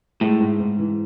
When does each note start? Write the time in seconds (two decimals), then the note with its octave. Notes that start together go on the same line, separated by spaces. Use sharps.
0.20 A2 G#3
0.40 G#2
0.60 G#2
0.79 E3